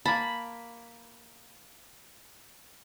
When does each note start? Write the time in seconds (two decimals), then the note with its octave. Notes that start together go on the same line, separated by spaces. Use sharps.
0.05 A#3 A5 B5